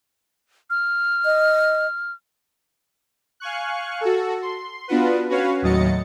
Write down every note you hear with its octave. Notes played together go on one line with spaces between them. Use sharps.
F6
D#5
F5 G#5 C#6 F#6
F#4 A4
C6
B3 D4 F4 F#4 B4
C#4 F#4 B4 C#5 F5
D#2 A2 F#3 D#5 A6 C#7